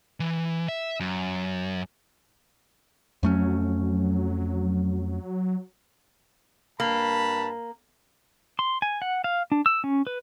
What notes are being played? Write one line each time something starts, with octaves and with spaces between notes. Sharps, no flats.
E3
E5
F#2
F2 F#3 A3 C#4
G2 A#3 A5 B5
C6
G#5
F#5
F5
D4
E6
C#4
B4